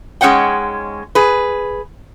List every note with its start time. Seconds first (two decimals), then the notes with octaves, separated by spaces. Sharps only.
0.21 G#2 G#3 C#4 C#5 F#5 G5
1.15 G#4 B4